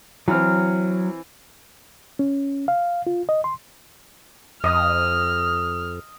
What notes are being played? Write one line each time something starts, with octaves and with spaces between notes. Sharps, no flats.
E3 F#3 C4 F6
C#4
F5
F4
D#5
C6
F2 D#5 D#6 F6